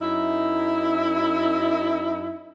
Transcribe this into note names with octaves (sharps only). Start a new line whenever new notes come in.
F#2 D#4 E4